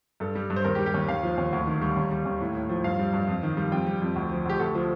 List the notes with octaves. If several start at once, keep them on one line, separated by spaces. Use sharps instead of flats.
G2 A4
G3
G2
C5
D#2 A#4
G4
G3
G4
D#2
D#2 F5
F3
D#2
D2
D#3
G3
D#2
G3
D#2
A2
A2
F3
G2 F5
G3
G2
F2
D#3
G3
F2 G5
G3
F2
D2
F3
D2 G4
D2 A4
F3